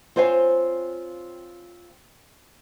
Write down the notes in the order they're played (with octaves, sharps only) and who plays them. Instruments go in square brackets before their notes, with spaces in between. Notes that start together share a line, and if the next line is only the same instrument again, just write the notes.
[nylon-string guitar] C4 F4 C5 C#5 F5 G#5